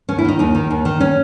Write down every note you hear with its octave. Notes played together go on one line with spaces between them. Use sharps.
D#2 C#4
E4
D#3 D#4
D#2 D#4
D#3
D#2
D#3
C#4